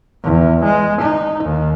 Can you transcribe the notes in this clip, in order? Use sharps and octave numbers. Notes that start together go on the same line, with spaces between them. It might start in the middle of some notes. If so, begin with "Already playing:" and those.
E2
G#3
D#4
D#2